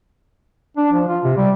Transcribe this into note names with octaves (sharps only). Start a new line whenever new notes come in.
D4
F3
F4
C3
G3